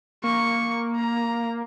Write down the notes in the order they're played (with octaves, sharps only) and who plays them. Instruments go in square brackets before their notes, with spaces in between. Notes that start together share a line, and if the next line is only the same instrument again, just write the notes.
[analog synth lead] A#3 [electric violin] C#6
[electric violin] A#5